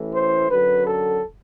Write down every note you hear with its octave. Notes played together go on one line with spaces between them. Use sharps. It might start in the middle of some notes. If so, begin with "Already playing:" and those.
Already playing: A1 A2 E3
C5
F#2 D3 F#3 B4
A4